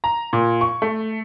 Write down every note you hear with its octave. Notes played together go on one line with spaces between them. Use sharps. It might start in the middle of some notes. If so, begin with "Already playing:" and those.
A#5
A#2
C#6
A3